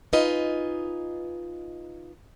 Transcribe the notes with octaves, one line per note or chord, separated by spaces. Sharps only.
D#4 F4 B4 D#5 G#5